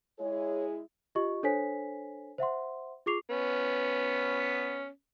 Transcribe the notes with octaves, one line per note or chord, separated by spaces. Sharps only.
G#3 E4 G#4 C#5
F4 G4 D#5 C#6
D4 A4 C5 C#5 G#5 B6
C5 E5 F#5 C6
F4 G#4 C#6 D6 C7 F7
B3 C#4